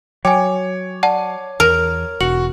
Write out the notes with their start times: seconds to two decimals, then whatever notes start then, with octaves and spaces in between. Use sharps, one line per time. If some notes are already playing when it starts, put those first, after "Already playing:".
0.25 F#3 C#5 G5 G#5 D6
1.03 D5 F#5 A5
1.60 E2 A#4
2.21 E1 F#4 C#7 F#7